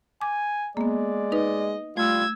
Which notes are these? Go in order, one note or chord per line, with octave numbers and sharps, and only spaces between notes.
G#5 D6
G#3 A#3 B3 D5
D#4 B4 D#5
G3 A3 F4 E6 G#6